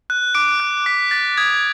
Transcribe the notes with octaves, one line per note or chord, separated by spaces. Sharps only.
F#6
D6 D7
F#6
D6 B6
F#6 A6
D#6 G#6